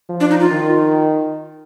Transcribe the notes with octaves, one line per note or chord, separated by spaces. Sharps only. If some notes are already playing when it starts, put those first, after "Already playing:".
F3
D4
D#4
F4
D#3